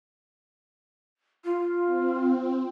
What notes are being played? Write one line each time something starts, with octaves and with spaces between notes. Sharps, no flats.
F4
C4